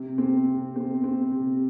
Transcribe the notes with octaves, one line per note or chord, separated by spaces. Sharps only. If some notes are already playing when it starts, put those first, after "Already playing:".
Already playing: C3
C4
C3
C4
C4
C3